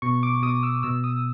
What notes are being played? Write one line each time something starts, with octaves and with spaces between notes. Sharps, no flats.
B2 C#6
D6
B2 D#6
E6
B2 E6
D#6